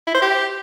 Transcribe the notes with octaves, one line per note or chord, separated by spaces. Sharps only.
E4
C5
G4